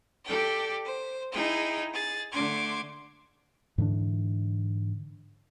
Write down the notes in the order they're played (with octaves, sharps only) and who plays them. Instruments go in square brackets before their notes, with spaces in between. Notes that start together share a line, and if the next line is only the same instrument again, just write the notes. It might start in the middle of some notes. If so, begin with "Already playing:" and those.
[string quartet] G4 A4 D5 G5
C5
D#4 E4 G#4 G5
G#4 A6
D3 A3 C6 D6 G#6
[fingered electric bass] G#2 D3 E3 D4